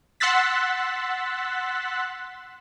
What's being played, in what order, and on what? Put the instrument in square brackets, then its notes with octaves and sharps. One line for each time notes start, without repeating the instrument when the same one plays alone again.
[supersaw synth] F#5 C6 E6 F#6 A6 B6